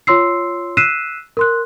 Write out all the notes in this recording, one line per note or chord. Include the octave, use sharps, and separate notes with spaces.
F4 C#5 C6 E6 C7
E6 F#6 B6 C7 D#7 E7
A#4 C6 F#6